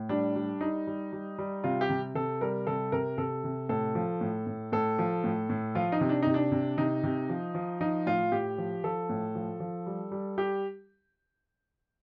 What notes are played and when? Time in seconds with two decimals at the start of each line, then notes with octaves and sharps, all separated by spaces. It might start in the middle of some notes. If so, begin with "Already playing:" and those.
Already playing: A2
0.09 G3 D4
0.36 G3
0.61 G3 D#4
0.87 G3
1.13 G3
1.39 G3
1.64 C3 F4
1.81 G4
1.90 C3
2.15 C3 A4
2.41 G3 A#4
2.67 C3 A4
2.92 C3 A#4
3.18 C3 A4
3.44 C3
3.69 A2 A4
3.95 F3
4.21 A2
4.47 A2
4.72 A2 A4
4.99 F3
5.24 A2
5.49 A2
5.75 F3 F4
5.92 D#4
6.01 C3
6.09 D4
6.22 C3 D#4
6.34 D4
6.52 C3
6.78 C3 D#4
7.03 C3
7.29 F3
7.55 F3
7.80 F3 D#4
8.06 A2 F4
8.32 A2 G4
8.58 F3
8.84 F3 A4
9.09 A2
9.35 F3
9.60 F3
9.86 G3
10.11 G3
10.38 G3 G4